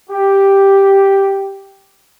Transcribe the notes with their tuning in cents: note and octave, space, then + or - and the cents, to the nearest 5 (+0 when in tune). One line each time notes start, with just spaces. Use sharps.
G4 +0